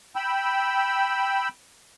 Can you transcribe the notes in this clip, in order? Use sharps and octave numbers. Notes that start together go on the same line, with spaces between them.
G5 B5 E6